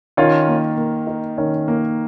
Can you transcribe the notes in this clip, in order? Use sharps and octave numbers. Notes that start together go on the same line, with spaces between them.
D#3 C#4 F4
A#3
A#3
D#4
D#3 C#4
A#3